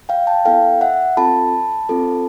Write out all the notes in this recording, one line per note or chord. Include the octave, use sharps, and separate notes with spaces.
F5 G5
G5 A5
B3 E4 A4 F5 G5
E5 F#5
C4 F4 A4 A5 B5
C4 F4 A4